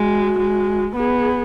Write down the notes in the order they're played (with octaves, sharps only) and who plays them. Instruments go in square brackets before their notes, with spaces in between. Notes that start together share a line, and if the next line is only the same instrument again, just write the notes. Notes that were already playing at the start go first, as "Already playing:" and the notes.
Already playing: [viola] G#3 [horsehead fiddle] F#4
[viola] G#3
[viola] B3 [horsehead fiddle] G#4